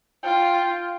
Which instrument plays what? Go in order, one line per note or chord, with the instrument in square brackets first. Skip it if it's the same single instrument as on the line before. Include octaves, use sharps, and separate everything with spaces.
[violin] F4 [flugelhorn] G5